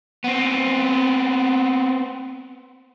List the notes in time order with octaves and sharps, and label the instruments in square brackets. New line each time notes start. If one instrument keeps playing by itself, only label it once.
[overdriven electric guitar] B3 C4